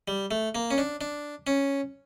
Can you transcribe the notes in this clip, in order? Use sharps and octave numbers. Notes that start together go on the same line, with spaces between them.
G3
A3
A#3
C#4
D4
D4
C#4